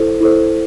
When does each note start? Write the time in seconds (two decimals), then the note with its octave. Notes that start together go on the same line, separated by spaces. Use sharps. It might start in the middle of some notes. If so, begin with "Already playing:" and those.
Already playing: E4 A4 C5
0.20 E4 A4 C5